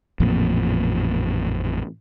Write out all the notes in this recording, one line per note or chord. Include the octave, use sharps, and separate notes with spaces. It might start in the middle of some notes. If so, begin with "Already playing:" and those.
A1 F2 A#2